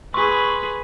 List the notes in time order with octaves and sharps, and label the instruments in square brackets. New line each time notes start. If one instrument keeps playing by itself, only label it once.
[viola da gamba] G#4 B4 [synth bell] C6 C#6